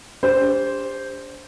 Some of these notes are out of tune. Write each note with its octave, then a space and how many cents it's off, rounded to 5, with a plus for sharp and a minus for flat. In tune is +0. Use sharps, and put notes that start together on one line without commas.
D4 -30 G4 +35 C5 +0